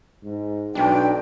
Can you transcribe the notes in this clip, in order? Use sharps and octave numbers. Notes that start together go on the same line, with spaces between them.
G#2
B1 D4 G5